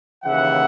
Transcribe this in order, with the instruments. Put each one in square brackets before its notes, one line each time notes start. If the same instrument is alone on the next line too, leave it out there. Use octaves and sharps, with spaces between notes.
[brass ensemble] D#2 C#3 E3 E5 F#5